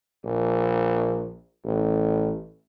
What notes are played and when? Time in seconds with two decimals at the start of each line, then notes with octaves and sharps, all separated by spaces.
0.25 A#1
1.65 A1